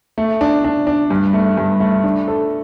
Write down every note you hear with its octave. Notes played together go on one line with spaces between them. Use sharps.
A3
D4
D4
D4
G2
A3
G2
A3
D4
A4